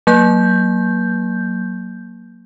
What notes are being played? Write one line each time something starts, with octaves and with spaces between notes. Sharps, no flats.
F#3 A#3 G6